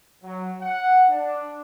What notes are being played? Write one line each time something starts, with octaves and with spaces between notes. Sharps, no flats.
F#3
F#5
D4